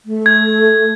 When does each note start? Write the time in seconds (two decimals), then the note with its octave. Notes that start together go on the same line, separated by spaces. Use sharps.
0.05 A3
0.26 G#6